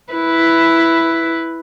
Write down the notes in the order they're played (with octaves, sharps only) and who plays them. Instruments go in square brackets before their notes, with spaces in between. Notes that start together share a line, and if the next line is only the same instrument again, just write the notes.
[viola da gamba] E4 B4